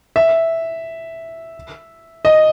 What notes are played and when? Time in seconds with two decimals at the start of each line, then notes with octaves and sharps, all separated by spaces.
0.16 E5
2.25 D#5